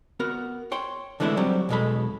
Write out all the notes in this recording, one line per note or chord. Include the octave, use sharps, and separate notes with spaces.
B3 F#4 A#4
C#5 G5 C6
D3 E3 G#3 A3 D4 E4
F#3 G3 C4
B1 E2 B2 G#3 A4 B5